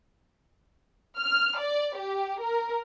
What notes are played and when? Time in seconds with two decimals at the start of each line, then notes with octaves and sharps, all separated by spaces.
1.19 F6
1.60 D5
1.97 G4
2.42 A#4